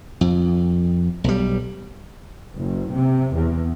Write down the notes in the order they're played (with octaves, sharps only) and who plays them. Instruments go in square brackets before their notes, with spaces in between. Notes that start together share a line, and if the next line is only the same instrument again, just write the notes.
[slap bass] F2
B1 G3
[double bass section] F#1
C3
E2